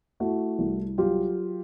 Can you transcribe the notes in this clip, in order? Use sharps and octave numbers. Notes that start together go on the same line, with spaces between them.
A3 E4 F#4
C2
F#3 F4 G4